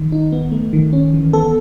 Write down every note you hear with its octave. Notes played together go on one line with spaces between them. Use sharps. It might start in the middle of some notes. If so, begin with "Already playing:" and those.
Already playing: D#3
D#4
B3
A3
D#3
C#4
E3
B3 A4